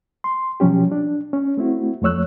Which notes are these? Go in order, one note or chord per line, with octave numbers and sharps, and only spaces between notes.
C6
B2 F3 F#3 C#4 G4
D4
C#4
A3 C4 E4 F#4
F2 F3 A3 C#5 E6 F#6